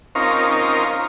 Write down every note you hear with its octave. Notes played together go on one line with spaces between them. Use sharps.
C4 C#4 D#4 F4 A#4